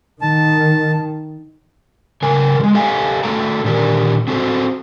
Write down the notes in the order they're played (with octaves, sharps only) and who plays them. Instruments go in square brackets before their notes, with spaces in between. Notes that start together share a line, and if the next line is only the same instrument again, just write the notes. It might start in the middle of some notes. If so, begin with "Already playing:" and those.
[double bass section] D#3 [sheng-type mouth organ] A5
[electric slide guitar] C#3 A#4 G#5
F3 G#3
G4 A4 D#5 F5 F#5 G#5
A3 F#4 A4 G5 A#5
A#2 D3 D#3 G4 A#4 D5
C4 F#4 A4 C5